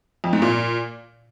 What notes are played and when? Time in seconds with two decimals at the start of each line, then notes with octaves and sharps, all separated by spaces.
0.24 F2
0.33 G#2
0.42 A#2